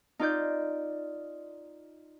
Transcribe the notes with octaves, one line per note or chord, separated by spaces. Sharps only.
D#4 F4 D5 G6